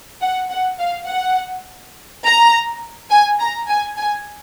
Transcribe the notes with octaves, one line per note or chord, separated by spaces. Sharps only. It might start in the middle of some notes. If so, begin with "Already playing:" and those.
F#5
F#5
F5
F#5
A#5
G#5
A#5
G#5
G#5